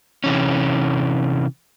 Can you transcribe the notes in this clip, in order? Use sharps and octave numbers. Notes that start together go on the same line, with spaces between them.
C3 E3 C#4